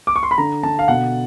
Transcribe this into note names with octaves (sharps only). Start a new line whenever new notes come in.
D6
C#6
C6
B5
D3 A#5
D3 A5
F5
B2 F#5